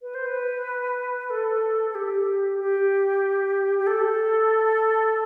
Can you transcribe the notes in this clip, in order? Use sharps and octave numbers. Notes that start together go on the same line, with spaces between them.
B4
C5
B4
A4
A4
G4
G4
G4
A4